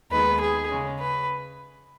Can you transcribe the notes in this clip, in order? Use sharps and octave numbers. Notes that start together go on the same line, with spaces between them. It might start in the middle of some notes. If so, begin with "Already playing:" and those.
D#2 D#3 G#3 B3 B4
G#4
C#3 G#3 C#4
B4